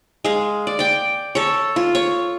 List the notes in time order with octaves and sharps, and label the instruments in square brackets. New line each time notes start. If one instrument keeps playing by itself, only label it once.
[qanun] G#3 F5
D5
D5 G5
A4 C#5
F4
C#5